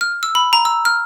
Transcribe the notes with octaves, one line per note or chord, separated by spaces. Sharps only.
F6
E6
B5
A#5
E6
F6